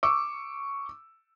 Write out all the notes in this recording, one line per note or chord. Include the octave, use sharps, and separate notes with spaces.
C#6 D6 E6